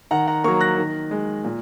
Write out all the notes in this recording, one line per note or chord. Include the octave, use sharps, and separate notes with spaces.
D#3 F#5 A#5
F#5 A#5
F#3 A#3 A#5 C#6
F#6 A#6
D#3
G#3
A#2